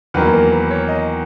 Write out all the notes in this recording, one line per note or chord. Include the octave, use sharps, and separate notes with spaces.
E2 D#3 F#3 A#3 B4
A#4
B4
C#5
D#5